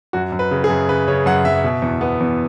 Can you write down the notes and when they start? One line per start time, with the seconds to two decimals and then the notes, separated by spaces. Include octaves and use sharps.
0.13 F#2 F#4
0.32 F#2
0.39 B4
0.51 C#3
0.64 G#4
0.69 F#2
0.88 C#3 B4
1.08 C#3 C#5
1.26 F#2 F#5
1.44 F#2 E5
1.64 B2
1.82 E2
2.01 B3
2.20 E2